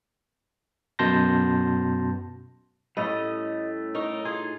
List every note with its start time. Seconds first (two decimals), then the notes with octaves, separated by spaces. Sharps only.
0.99 F#2 B2 A5 C6 G6 A#6
2.97 A2 G3 A3 C#4 D#5
3.95 D#4 A#4 C#5
4.25 F4 G#4